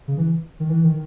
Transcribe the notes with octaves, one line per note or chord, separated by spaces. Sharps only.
C#3
E3
D#3
E3
D#3